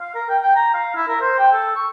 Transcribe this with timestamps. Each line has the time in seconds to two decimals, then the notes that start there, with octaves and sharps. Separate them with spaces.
0.01 F5
0.15 A#4
0.29 G5
0.41 G5
0.56 A#5
0.74 F5
0.96 E4
1.08 A#4
1.21 C5
1.39 G5
1.52 A4
1.76 C#6